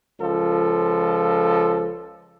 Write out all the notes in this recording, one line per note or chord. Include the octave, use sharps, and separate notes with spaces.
C#2 F3 A4